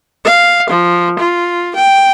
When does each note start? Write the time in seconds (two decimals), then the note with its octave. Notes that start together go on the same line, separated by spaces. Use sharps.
0.25 F5
0.69 F3
1.19 F4
1.75 G5